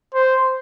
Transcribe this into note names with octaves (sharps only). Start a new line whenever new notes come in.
C5